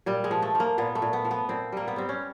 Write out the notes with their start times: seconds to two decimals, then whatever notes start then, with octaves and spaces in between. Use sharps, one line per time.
0.06 A#2 G3
0.24 G#3
0.31 F3
0.42 A3
0.55 F3
0.60 A#3
0.78 A#2 B3
0.95 A3
1.02 A#2
1.13 B3
1.25 F3
1.31 B3
1.49 A#2 C4
1.72 G3 A#3
1.88 B3
1.96 G3 C4
2.09 C#4